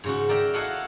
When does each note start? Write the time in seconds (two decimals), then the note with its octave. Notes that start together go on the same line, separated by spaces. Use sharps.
0.04 G#2 C#3 F#4
0.29 A#4 D5 E5 G5 A#5
0.53 E4 F#4 A4 D#5 F5 F#5